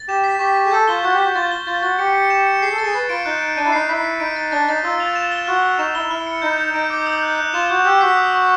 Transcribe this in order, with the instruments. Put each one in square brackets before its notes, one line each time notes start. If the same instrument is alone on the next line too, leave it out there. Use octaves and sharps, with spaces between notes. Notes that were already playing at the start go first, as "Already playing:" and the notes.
Already playing: [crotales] A6
[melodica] G4 [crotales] E7
[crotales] B6
[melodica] G4 [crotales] C#6
[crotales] C#6
[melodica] G#4
[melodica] A4 [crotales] G6
[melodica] F4 [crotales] G7
[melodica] F#4 [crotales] G6
[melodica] G4 [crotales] G6
[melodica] F#4
[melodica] F4 [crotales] A6
[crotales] G7
[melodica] F4 [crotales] A6
[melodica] F#4 [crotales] A6
[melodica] G4 [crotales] C#7
[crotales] C#7
E7
C#7
[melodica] G#4 [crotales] C7
[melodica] A4
[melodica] G#4 [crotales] A6
[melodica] B4 [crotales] A6
[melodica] F4 [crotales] D7
[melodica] D#4 [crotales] F#6
[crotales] D7
[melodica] D4 [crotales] D#7
[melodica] E4
[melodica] D#4 [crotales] C7
[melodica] E4 [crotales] B6
[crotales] B6
[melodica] D#4 [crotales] D7
[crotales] A6
[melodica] D4 [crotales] A6
[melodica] D#4 [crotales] A6
[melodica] F4 [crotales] E6
[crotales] F7
E7
G7
[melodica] F#4 [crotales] F6
[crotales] F6
[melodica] D#4 [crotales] E7
[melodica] E4 [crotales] G7
[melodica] E4 [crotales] F6
[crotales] C#7
[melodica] D#4 [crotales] G6
[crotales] G6
[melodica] D#4 [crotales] D7
[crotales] D6
D#6
F#6
F#6
[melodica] F4 [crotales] E7
[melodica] F#4 [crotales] G6
[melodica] G4 [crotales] E6
[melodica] F#4 [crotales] B6
[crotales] D#6
C#6